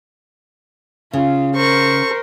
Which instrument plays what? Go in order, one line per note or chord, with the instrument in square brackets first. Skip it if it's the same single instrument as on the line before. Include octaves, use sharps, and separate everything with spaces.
[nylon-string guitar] C#3 [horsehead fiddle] F4
[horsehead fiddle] A#4 C5 [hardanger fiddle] C#6